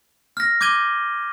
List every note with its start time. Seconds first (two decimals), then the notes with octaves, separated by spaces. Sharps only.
0.37 F6 A#6
0.61 D6 G6 G#6 D#7 G7